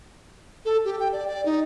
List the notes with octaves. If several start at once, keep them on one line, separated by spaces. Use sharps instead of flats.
A4
G4
G5
D5
D5
D#4